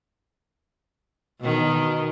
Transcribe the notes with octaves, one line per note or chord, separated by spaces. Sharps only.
B2 D#3